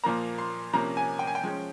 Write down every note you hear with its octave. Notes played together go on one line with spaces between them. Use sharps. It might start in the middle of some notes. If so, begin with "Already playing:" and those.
A#2 F3 A#3 A#5
C6
C3 F3 A#3 C#4 A#5
G#5
G5
G#5
G5
F3 G#3 C#4